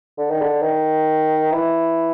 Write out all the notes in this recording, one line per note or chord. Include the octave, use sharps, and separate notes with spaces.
D3
D#3
D3
D#3
E3